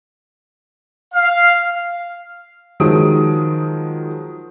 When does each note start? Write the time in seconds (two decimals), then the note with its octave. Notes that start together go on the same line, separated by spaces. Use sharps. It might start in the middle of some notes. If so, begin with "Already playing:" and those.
1.13 F5
2.80 D#3 F3 F#3 G#3 D#6 D7